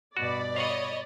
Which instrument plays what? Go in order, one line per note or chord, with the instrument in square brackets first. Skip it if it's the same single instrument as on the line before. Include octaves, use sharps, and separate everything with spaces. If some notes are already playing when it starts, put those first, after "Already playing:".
[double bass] G2 B2 [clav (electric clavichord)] F#4 [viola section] D5 B5
[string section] C#5 D#5 [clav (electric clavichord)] F5 F#5